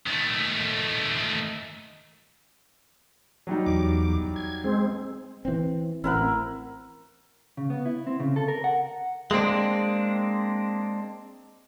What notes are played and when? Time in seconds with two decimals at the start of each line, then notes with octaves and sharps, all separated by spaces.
0.07 D#3 A3
3.47 F#3 G3 D#4
3.66 E2 D6
4.36 G#6
4.64 G#3 C4
5.45 E3 C4
6.04 A1 C4 E4 A#4 F#5
7.57 C#3
7.70 B3
7.86 E4
8.07 C4
8.20 C#3
8.36 A4
8.48 A#4
8.64 F#5
9.31 G#3 A#3 C4 D4